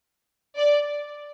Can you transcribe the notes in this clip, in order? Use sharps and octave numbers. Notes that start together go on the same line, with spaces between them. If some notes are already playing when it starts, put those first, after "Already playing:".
D5